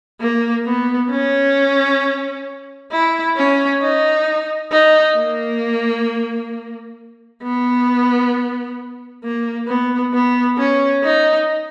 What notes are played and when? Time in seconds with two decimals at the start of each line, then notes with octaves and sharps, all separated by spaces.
0.21 A#3
0.66 B3
1.11 C#4
2.92 E4
3.37 C#4
3.82 D#4
4.72 D#4
5.17 A#3
7.43 B3
9.24 A#3
9.68 B3
10.13 B3
10.58 C#4
11.04 D#4